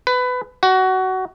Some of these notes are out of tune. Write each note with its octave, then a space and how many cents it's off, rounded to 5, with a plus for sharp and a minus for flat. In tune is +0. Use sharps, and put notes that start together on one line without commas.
B4 +20
F#4 +20